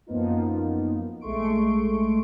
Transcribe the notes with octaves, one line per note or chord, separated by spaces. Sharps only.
F#2 F3 A#3 B3 D#4 F4
A#1 G#3 A3 C6 C#6 D7